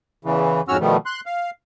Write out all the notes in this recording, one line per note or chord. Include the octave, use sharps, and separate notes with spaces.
E2 C#3 E3
F2 G#2 C#4 F#4 E6 F6
B2 D#3 F3 G3 A3 B3
C6 F#6
F5